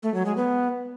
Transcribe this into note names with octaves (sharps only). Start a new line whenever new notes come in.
A3
F#3
G#3
B3